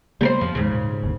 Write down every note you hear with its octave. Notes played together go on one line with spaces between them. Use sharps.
C#3 G3 A#3 B3 A#4 C5
F2 F3
D#2 G#2 C#3
A#2
F#1 D#2 D3